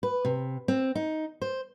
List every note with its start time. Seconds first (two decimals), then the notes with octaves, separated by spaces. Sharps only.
0.03 B4
0.25 C3
0.68 C4
0.95 D#4
1.41 C5